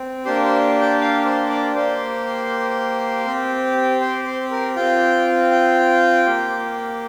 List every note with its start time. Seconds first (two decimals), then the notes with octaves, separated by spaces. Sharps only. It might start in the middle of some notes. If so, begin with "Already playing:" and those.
Already playing: C4
0.25 A#3 D4 G4 C5
0.44 C5
0.81 G5
1.01 F5
1.25 C5
1.50 D5
1.75 A#3 G4 C5
3.25 C4 G4
4.00 C5
4.26 C5
4.51 A#4
4.76 C4 F4 G5
5.51 G5
6.26 A#3 G4